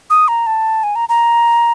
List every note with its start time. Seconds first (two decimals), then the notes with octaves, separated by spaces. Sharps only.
0.10 D#6
0.28 A#5
0.47 A5
0.83 G#5
0.96 A#5
1.09 A#5